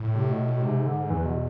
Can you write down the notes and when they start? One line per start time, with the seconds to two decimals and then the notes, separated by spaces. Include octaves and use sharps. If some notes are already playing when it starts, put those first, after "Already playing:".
Already playing: A2
0.15 C3
0.31 B2
0.46 B2
0.62 G#2 C3
0.86 D3
1.10 E2 E3
1.26 B2